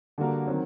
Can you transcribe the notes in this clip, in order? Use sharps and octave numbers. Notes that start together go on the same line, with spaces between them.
D3 G3 A#3 F#4 A#4
D#3 F#3 C4